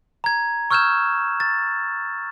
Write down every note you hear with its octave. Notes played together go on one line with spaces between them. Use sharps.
A#5 G#6
C#6 E6 F6 G6 G#6 E7
A6